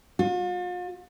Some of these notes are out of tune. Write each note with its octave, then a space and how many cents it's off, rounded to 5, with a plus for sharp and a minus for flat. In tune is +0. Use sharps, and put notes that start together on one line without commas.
F4 +45